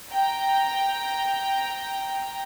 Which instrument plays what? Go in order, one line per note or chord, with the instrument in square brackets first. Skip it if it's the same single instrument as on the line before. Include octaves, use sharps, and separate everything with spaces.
[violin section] G5 A#5